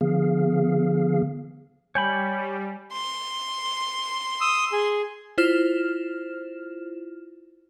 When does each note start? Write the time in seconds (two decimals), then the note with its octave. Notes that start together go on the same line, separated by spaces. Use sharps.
0.01 D3 F3 B3 G#4 F5
1.95 G3 C#5 G5 G#5 B5 G6
2.92 C6
4.41 D#6 E6
4.72 G#4
5.38 E4 F4 C5 F6 E7